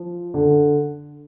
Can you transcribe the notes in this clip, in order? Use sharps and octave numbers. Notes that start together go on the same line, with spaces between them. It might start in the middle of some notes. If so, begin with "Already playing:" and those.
Already playing: F3
D3